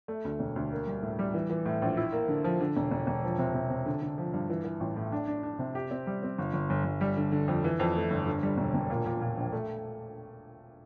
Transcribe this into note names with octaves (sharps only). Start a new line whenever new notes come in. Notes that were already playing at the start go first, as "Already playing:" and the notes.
A3
D2
E1
D2
A#3
G3
A2
G3
E3
E3
A2
A#1
E4
A#3
D3
F3
D3
E1
E1
E1
F3
C3
C3
C3
D3
D3
F3
G2
E3
E3
A1
A2
D4
D4
D4
C3
G4
C4
G3
C4
G1
G1
G1
G1
G3
D3
D3
F2
E3
F2
A3
G1
D3
G3
E1
E1
A#2
A#2
A#2
A#1
A3